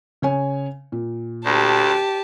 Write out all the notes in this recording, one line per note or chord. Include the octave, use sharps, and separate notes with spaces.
C#3 C#5 G#5
A#2
D2 G4 A5